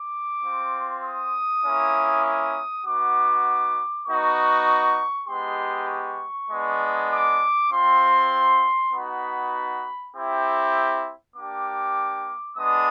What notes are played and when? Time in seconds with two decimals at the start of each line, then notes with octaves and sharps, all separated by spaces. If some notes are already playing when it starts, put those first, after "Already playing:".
Already playing: D6
0.43 C4 F4
1.03 D#6
1.64 A#3 C#4 E4
2.25 D#6
2.85 B3 D#4 F#4 D6
4.07 B3 D#4 F#4 C#6
5.28 G#3 B3 D#4 G4 C6
5.89 C#6
6.50 G#3 B3 D4
7.11 D6
7.71 C4 F4 C6
8.92 B3 D#4 F#4 B5
10.14 C4 E4 G4
11.36 A#3 D4 G4 D6
12.57 G#3 B3 D4 D#6